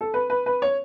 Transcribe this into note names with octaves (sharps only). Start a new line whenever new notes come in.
A4
B4
B4
B4
C#5